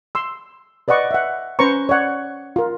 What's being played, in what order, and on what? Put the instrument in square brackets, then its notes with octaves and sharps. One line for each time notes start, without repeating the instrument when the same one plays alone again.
[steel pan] C6 E6
B4 D5 D#5 F#5 C#6
E5 F#5
C#4 B4 C5 A#5 C#6
C#5 D5 F#5
F4 A#4